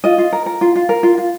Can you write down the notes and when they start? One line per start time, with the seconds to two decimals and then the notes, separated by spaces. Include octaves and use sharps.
0.04 F4 D#5
0.18 F4
0.33 A#4
0.46 A#4
0.61 F4
0.76 F4
0.89 A#4
1.03 F4
1.18 F4